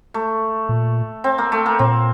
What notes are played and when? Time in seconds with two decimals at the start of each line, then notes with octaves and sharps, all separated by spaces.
0.14 A3
0.69 A#2
1.24 C4
1.38 A#3
1.52 A3
1.66 A#3
1.79 A#2 C4